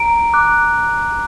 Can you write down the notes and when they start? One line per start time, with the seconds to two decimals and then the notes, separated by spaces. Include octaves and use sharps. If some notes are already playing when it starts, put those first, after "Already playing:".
Already playing: A#5 D7
0.33 D6 F#6